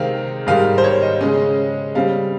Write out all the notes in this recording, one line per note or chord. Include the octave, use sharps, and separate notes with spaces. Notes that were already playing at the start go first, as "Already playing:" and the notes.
Already playing: C3 D#3 G#3 C4 F5
G#2 D#3 G3 F5
C5
C#5
D#5
C#3 G#3 C#4
C#3 G3 C4 F5